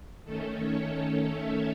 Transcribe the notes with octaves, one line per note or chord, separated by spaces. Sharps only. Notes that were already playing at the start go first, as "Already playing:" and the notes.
D#3 A3 C#4 A4
C#5
C#5
E5